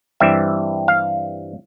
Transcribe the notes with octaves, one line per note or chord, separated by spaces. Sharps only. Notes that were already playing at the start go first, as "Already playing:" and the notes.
G2 E3 G3 C4 E5
F5